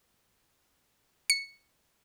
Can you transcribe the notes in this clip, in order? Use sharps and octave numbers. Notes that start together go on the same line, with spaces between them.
C#7